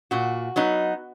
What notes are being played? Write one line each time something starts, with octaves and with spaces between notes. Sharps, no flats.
A#2 F#4
F#3 B3 D#4